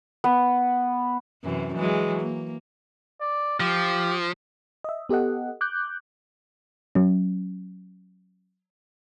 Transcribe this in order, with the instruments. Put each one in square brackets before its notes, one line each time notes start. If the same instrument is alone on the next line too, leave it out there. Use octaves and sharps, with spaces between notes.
[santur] B3
[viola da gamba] F#2 C3 E3
E3 F#3 G#3
A#3
[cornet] D5
[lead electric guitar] F3 [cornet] G4
[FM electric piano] D#5 E5
B3 G4 A4 D#5 F#5
D6 F#6 G6
[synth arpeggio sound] F#3 C#4